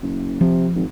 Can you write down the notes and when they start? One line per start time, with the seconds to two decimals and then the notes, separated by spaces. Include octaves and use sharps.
0.02 F#1
0.41 C3 F3
0.75 G#1